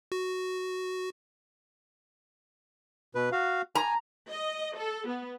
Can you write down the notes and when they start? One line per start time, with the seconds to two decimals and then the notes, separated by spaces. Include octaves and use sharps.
0.12 F#4
3.15 B2 B4
3.32 F#4 F5
3.75 G#5 A#5
4.31 D#5
4.77 A4
5.07 B3